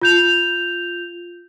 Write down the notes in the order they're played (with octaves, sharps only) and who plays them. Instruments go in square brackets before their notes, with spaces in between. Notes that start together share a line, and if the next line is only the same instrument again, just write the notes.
[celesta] F4 G6 F7